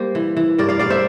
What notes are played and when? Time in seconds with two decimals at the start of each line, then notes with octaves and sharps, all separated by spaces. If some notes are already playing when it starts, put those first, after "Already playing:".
Already playing: G3 A#3 C5
0.15 E3
0.37 E3
0.58 G2 A#4 D5
0.69 D5 F5
0.79 G2 D5 F5
0.90 C5 E5